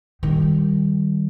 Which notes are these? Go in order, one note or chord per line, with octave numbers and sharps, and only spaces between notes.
D#3 G3